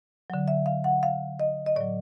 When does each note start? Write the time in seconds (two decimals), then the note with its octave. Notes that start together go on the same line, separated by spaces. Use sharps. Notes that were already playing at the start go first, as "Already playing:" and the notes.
0.30 D3 F#3
0.48 E5
0.66 F5
0.84 F#5
1.03 F5
1.40 D#5
1.66 D#5
1.76 A2 F#3 D5